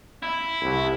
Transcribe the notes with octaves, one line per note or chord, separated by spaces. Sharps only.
E4
C2